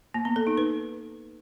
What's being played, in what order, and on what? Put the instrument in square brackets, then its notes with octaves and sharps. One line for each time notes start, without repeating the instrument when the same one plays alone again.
[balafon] A#3
B3
A4
D#4
B4